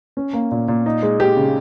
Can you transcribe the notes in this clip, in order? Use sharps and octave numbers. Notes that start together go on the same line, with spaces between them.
C#4
A#3
A#2
A#2
D#4
G#3
G4
C#3